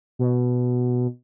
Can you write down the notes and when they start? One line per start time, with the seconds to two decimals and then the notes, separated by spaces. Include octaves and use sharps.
0.19 B2